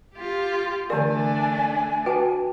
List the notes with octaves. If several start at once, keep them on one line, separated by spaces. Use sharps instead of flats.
F4 G4
D3 E3 A3 D4 A#4 D5 G#5
F#4 B4 G5 A5